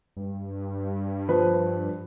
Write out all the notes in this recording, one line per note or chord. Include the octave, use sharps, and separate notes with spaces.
G2
F3 B4